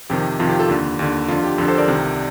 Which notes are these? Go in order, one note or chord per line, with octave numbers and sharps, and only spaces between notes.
F2 C3 D#3 G4
F2 C3 D#3 F4
G4
F4 A4
D#2 D3
D#2 D3
F2 D3 F4
G4
F2 D3 F4 A4
A4 C5
A#4 D5
C2 C3 D#3